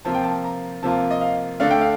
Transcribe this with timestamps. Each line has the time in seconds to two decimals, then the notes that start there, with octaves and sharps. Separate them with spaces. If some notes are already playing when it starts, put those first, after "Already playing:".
0.05 C3 F3 A#3 F4 A5
0.15 G5
0.24 A5
0.44 A#5
0.83 C3 F3 A#3 F4 A5
1.11 D#5
1.21 F5
1.60 D3 A3 D4 F5
1.71 G5
1.81 F5